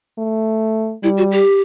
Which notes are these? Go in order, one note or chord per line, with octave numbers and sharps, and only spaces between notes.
A3
G3 E4
F#4
G4